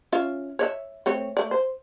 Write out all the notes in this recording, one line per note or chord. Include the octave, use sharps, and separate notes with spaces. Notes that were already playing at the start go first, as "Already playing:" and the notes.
C#4 F4 E5
C#5 D5 E5
A3 C4 C#5
A3 D5
C5